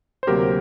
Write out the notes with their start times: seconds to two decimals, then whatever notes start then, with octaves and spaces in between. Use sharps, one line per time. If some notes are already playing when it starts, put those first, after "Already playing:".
0.23 C5
0.27 D2 C3 F#3 A#3 G4 A#4